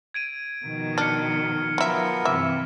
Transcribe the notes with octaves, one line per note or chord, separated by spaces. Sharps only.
G#6 D7 D#7
B2 D#3 F3
D4 F6 C#7
D#3 F3 F#3 B3 A#4 E5
G2 C3 E3 E5 D6